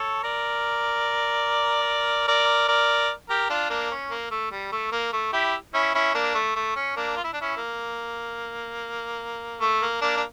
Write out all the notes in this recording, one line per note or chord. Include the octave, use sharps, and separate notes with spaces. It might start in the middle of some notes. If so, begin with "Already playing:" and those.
Already playing: A4 C#5
A#4 D5
A#4 D5
A#4 D5
G4 A#4
D4 F4
A#3 D4
C#4
A#3
A3
G3
A3
A#3
A3
E4 G4
C#4 E4
C#4 E4
A#3 D4
A3
A3
C#4
A#3 D4
F4
E4
D4
C#4 E4
A#3
A3
A#3
A#3 D4
D4